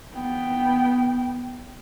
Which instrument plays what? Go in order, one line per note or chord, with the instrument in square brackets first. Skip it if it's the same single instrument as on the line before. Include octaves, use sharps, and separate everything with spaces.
[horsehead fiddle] B3 G5